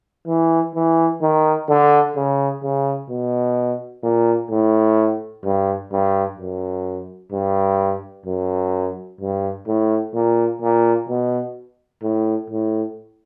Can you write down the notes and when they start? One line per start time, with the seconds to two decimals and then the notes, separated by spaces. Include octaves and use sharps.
0.27 E3
0.75 E3
1.22 D#3
1.69 D3
2.16 C#3
2.63 C#3
3.09 B2
4.03 A#2
4.50 A2
5.44 G2
5.92 G2
6.38 F#2
7.32 G2
8.26 F#2
9.21 G2
9.68 A2
10.14 A#2
10.61 A#2
11.09 B2
12.03 A2
12.50 A2